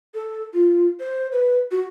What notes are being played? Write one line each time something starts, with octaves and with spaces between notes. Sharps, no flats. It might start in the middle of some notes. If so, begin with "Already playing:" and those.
A4
F4
C5
B4
F#4